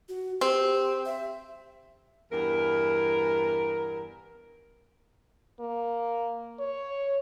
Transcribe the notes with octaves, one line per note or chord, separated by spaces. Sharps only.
F#4
C4 G4
E5
E2 G2 A#4
A#3
C#5